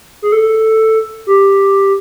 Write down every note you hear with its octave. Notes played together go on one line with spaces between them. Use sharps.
G#4
A4
G4